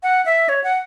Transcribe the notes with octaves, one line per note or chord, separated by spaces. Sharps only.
F#5
E5
C#5
F#5